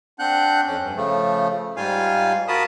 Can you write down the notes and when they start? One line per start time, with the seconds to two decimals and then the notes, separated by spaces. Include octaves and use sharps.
0.19 C4 D4 F#5 F#6 G6
0.66 F2 C#4
0.80 G2
0.96 C#3 F3 A3
1.77 G#2 G3 F4 F5 G#5
2.48 F4 F#4 A#4 A5 B5 D#6